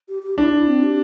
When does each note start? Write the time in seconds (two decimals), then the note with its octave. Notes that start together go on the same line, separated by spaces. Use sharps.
0.09 G4
0.23 G4
0.38 D4 E4
0.53 E4
0.67 C4
0.83 G4